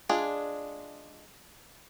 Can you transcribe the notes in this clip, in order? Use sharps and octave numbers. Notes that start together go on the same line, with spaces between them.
G#3 D4 F4 G#4